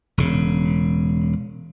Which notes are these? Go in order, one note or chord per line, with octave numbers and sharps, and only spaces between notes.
E1 C#3